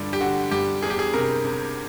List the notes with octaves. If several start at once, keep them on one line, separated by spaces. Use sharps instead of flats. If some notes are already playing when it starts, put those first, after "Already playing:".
Already playing: G2 D3 F3 D4
G4
D3 F#4
G2 G4
E2 G#4
G4
G#4
C3 A#4
C3